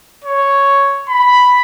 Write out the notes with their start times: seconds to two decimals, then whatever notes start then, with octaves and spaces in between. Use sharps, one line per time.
0.24 C#5
1.09 B5